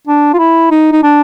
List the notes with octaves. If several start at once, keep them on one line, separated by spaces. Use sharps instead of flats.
D4
F4
E4
D#4
D#4
D4